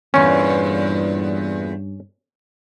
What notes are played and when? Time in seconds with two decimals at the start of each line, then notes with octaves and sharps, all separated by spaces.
0.14 E2 G2 A#2 C#4